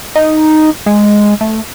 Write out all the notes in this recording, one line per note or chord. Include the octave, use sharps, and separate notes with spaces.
D#4
G#3
A3